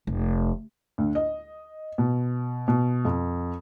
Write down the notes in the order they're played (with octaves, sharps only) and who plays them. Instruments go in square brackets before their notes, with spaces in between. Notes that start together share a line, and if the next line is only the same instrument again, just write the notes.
[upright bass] F1
[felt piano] D2
D#5
B2
B2
F2